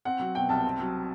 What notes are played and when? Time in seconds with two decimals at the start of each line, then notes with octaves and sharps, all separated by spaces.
0.05 C4 F#5
0.20 F#3
0.35 B2 G5
0.49 C2 A5
0.65 C4
0.80 F#3